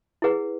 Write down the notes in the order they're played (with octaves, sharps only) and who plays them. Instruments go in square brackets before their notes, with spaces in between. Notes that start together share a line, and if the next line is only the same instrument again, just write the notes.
[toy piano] E4 G#4 B4 F#5